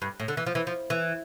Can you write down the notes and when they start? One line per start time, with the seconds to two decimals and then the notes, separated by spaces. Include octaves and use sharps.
0.02 G2
0.20 A2
0.28 D3
0.37 E3
0.46 F3
0.55 E3
0.67 F3
0.90 E3